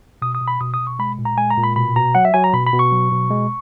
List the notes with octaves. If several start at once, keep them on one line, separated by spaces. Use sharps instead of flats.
B2 D#6
D#6
B2
B5
B2 D#6
D#6
B2
C#6
G#3 B5
A#2
A#5
G#3 G#5
A#5
A#2
B5
B2 B5
B2 A#5
F#3 F#5
E5
F#3 G#5
A#5
B2 B5
B5
B2
C#6
F#3
B2
G#3